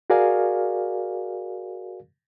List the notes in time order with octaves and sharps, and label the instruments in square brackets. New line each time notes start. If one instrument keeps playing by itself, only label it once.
[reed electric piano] F#4 G#4 A#4 D5 F5 G#5